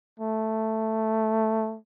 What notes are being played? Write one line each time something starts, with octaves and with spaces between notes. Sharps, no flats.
A3